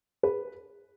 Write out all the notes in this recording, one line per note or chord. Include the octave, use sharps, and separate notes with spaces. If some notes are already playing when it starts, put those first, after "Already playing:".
B4